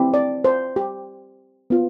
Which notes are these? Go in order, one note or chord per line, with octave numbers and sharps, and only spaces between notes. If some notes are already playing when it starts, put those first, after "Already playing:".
Already playing: C4 E4 G4
D5
C5
G4
B3 F4